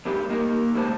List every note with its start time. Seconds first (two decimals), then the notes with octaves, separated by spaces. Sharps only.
0.05 D#2 G#2 G3 G4
0.29 D#3 A#3 G4 A#4
0.74 C#3 G3 G#3 C5 A5